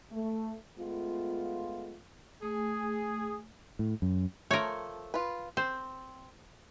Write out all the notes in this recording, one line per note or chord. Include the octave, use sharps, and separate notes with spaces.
A3
G#3 A3 B3 F4
A3 G#4
A2
F#2
F3 A3 A#4 C#5
F4 B4
C4 C5